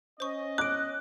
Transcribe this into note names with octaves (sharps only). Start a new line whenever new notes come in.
C#4 C5 D#5 C#6
D6 F#6 D7